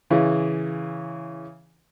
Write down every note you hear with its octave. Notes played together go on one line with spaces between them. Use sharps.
C#3 E3